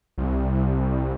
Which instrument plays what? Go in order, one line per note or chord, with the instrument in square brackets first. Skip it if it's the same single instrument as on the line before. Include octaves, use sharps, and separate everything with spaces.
[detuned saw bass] C2